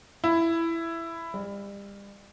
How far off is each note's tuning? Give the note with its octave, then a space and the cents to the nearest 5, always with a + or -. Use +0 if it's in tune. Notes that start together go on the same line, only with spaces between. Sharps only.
E4 +10
G3 +35